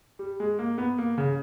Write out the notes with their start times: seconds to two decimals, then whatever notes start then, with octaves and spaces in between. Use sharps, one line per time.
0.19 G3
0.40 G#3
0.59 A#3
0.78 B3
0.98 A#3
1.18 C#3